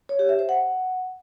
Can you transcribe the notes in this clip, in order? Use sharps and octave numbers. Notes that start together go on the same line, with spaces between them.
C#5
G4
E5
C5
F#5